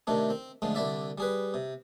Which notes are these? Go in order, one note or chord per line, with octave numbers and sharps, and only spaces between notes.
C3 D#3 A3 D4
C4
D3 F3 G#3 A3
C2 D3 E4 D5 E5
G3 G#4 B4
C3